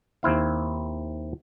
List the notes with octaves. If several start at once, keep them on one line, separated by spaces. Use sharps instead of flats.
D#2 C4 E4 F5